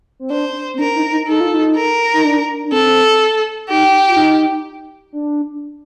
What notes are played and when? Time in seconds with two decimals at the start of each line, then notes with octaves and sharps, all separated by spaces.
0.19 C4
0.30 D4 C5
0.74 C4
0.79 D4 A#4
0.95 D#4
1.11 D#4
1.27 D#4 A4
1.40 F4
1.54 D#4
1.76 A#4
2.13 D#4
2.24 D4
2.65 D4
2.72 C4 A4
3.69 D#4 G4
4.08 F4
4.16 D#4
5.13 D4